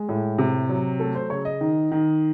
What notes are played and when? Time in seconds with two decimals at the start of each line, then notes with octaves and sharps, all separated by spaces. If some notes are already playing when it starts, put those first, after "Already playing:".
Already playing: G#3
0.09 A2
0.38 C3
0.69 F#3
1.00 A3 A4
1.15 C5
1.30 C#3 C#5
1.45 D#5
1.61 D#3
1.92 D#3